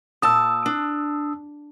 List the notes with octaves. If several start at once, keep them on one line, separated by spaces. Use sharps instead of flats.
A#2 A5 D#6 E6
D4